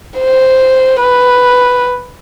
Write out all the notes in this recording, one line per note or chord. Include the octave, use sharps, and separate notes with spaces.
C5
B4